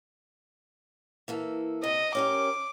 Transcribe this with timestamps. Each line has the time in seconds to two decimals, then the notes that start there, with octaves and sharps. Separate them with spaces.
1.28 E3 A#3 A4
1.83 C3 D#5
2.15 C#4 G4 A#4 D6